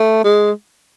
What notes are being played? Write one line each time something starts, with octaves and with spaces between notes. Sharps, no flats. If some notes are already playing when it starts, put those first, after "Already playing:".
Already playing: A3
G#3